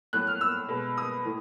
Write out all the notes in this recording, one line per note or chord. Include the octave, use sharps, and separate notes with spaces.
A2 F#3 A3 F#6
F6
E6
B2 G#3
D#6
A2 E3